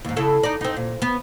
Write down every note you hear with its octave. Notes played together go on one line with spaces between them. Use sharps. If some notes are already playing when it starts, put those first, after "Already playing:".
D#2 G#2
C#3 E4 A4
D#4 D5
C4 D#4
A#2
B3